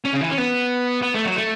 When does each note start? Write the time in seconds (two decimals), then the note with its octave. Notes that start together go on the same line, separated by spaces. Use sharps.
0.05 C#4
0.13 C#3
0.21 E3
0.30 C#4
0.38 B3
1.02 B3
1.14 A3
1.25 F#3
1.36 A3